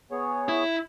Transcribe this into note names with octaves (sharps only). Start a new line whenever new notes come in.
B3 G#4 C#5
E4